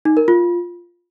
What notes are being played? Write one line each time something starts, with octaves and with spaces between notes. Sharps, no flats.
D#4
A#4
F4